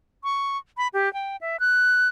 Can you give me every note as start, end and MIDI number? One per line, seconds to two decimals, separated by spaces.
0.24 0.57 85
0.77 0.88 83
0.93 1.12 67
1.14 1.36 79
1.41 1.57 76
1.60 2.08 90